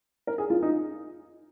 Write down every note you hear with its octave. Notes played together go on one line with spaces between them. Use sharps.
A#4
G#4
F4
D#4